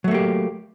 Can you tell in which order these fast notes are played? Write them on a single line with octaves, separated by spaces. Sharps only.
F#3 A3 A#3 G4